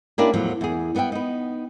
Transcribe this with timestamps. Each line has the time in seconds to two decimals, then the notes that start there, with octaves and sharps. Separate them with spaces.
0.18 A#3 C#4 D4 E4 G4 A#4
0.33 E2 A2 F3 F#3
0.61 E2 G#4
0.95 G3 B3 A4 E5 G5
1.12 B3 D#4